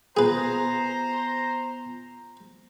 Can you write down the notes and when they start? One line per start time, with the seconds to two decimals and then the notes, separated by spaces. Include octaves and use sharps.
0.17 B3 F4 G#4 B4 C5 G#5 A#5